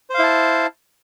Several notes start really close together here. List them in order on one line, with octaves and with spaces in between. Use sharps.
C5 F5 E4 A5